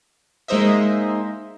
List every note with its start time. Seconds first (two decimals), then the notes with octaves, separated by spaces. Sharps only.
0.48 G#3 A#3 D#4 C5 D#5 E5